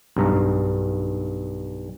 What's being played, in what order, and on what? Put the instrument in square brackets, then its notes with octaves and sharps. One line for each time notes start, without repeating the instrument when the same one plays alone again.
[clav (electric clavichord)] B1 G2 A#5